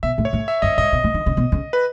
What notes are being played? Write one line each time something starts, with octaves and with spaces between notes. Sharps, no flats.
B2 E5
A2
C#5
A2
E5
F#2 D#5
G#2 D#5
B2
A2
D#3
C#3
B2
C#3
B4